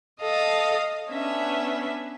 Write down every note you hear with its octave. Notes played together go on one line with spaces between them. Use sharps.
A4 D#5 F5 A5
B3 C#4 D4 E5